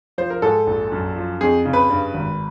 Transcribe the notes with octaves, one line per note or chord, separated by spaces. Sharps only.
F3 C5
A#4
G#2 A4
A#1
F#2
F3
F2 G#4
C#3
B4
G2
G#1